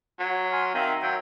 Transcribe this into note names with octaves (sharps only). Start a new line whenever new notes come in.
F#3
G#5 C6 F6
D#3 C4 E5 F5
F#3 G5